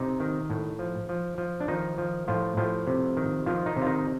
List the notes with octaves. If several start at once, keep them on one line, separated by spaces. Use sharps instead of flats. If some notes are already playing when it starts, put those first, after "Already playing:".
Already playing: C3 D#4
D#3
A2
F3
F3
F3
D4
D#3 F3 D#4
F3
A2 F3 F4
A2 F3 F4
C3
D#3
D#3 F3 F4
D#3 D#4
C3
F4
D#3 D#4